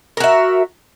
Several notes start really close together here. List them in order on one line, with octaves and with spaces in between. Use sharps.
A#4 F#4 E5